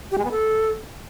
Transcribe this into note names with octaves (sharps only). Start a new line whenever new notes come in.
G4
G#3
B3
A4